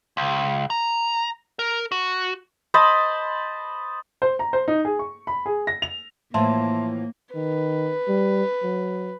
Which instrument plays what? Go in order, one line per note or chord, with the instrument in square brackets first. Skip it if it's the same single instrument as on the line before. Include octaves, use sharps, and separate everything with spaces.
[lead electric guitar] C#2
A#5
A#4
F#4
[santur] C5 D#5 A5 B5
[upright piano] C5
A#5
C5
D#4
G#4
C#6
B5
G#4
A#6
F7
[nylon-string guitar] A2 E3 F3 [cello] A#3 [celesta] E5 A5 C6
[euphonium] D#3 [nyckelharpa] B4
[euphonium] G3
F#3